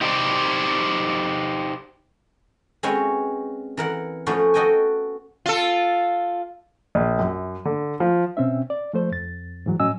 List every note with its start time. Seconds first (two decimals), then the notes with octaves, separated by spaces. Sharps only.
0.01 D#4 G4 C5 D5
2.83 G#3 C4 C#4 F#4 B4 C#5
3.77 E3 A#4 F#5
4.26 F3 A3 B3 C#4 F4 F#4
4.54 F#4 A4 D#5 G5 G#5
5.46 F4 A4
6.95 A#1
7.19 F#2
7.65 D3
8.00 F3
8.37 B2 C4 C#4 E5
8.70 D5
8.94 F3 A3 C5
9.12 F2 A6
9.66 G#2 E3 F#3
9.80 A2 F#3 C#4 D#5 G#5 E6